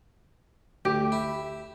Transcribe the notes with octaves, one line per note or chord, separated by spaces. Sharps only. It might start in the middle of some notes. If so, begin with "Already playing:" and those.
D2 G4
E4